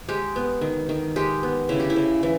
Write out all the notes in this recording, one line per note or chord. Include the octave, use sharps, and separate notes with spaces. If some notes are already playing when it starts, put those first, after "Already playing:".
G#3 G4
B3
D#3
D#3
G#3 G4
B3
C#3 E4
G4
E4
C#3
E3